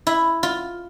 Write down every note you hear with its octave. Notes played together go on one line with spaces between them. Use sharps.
E4
F4